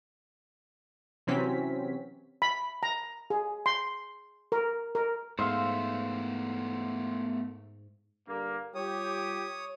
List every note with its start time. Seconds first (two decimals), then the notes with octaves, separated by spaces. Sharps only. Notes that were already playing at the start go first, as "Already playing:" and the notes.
1.27 C3 E3 F#3 C4 C#4 B6
2.42 B5
2.83 A#5
3.30 G#4
3.66 C6
4.52 A#4
4.95 A#4
5.39 G#2 A3 B3 C5 E5 F5
8.28 G2 D3 A#3
8.75 G3 F4 G4 C#5 D#6